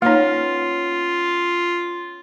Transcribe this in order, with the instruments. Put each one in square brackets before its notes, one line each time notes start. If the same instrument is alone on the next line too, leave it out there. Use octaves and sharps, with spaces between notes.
[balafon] A#3 D#4 [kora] B3 C#4 [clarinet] F4